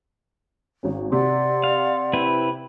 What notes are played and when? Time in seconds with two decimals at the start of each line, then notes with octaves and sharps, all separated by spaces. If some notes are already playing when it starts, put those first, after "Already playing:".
0.83 G#1 C#4
1.12 C3 D5 F#5 C6
1.64 F5
2.13 C4 E4 B4